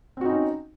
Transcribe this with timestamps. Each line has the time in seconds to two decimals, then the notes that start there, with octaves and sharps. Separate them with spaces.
0.17 C4
0.21 F#4
0.25 D#4
0.29 C#4